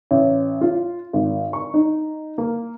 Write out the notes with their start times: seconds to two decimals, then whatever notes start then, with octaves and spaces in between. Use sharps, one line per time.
0.11 A1
0.61 F4
1.13 G#1
1.53 C#6
1.74 D#4
2.38 A#3